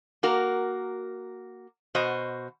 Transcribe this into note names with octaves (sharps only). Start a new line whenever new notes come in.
A#3 F#4 A#4
B2 F#4 C5 D#5